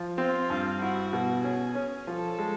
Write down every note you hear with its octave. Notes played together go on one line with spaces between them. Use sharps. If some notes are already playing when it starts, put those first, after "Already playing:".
Already playing: F3
C4 F4
G2
E4 F#4
B2
C#4 G#4
C#4
F3 A4
G#3